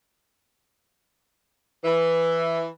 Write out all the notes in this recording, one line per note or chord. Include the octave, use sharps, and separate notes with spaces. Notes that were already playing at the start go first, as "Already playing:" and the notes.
E3